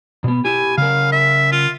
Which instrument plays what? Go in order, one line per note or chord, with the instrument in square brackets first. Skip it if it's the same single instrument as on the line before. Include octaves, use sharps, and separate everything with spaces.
[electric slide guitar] B2 B3
[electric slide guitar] E4 G4 [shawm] G#5
[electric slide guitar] C#3 A#4 [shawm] F5
[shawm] E5
F4